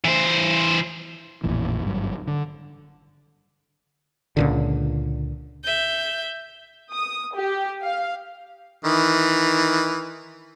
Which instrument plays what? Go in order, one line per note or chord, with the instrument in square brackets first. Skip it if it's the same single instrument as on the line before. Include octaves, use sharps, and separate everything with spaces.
[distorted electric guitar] E3 C5
[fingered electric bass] A1 F2 A#2 E3
G#1 G2 F#3
D3
[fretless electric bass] C#2 A#2 D3
[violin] E5 G6
[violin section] D#6
G4
F5
[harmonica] D#3 E3